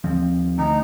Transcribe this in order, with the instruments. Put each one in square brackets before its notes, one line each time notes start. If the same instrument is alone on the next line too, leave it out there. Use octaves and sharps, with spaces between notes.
[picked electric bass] D#2 F3 C4
[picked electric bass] D2 [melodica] D#4